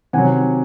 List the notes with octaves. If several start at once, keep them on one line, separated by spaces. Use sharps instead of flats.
C3 D#3 F#3 F#5 G#5